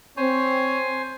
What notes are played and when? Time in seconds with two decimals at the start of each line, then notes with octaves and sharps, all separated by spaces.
0.17 C4 C5 C#5 G#5